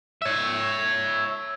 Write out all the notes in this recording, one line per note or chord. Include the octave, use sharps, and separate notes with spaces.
C#5 E5